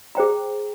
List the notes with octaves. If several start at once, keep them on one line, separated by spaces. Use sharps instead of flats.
G#4 C5 G5 A#5